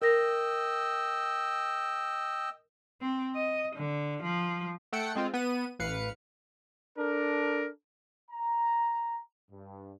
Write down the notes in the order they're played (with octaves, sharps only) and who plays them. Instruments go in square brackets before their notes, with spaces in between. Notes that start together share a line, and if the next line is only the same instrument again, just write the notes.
[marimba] A#4 A#6 [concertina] D#5 G5 E6
[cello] C4
D#5
D3
F3
[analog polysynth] A3 A4 F#5 G5 C#7
G#3 C4 F4
B3 D#7
A1 B4 F5 C#7
[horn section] D4 A4 A#4
[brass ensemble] A#5
G2